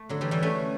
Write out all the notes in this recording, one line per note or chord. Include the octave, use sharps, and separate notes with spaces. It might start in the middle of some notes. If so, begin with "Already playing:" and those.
Already playing: A3
D3 F#3
E3 G3
E3 G3
A3 C#4